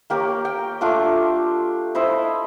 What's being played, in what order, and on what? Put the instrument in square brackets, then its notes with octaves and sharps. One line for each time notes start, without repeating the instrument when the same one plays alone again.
[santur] A#3 G4 A#4 C#5
G5
A3 D4 F4 D6
E4 C5 D#5 B5